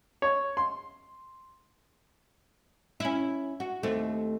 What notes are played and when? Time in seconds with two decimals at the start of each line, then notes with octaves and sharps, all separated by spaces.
0.22 C#5
0.57 C6
3.00 C#4 E4
3.60 F#4
3.83 D#2 A3 C4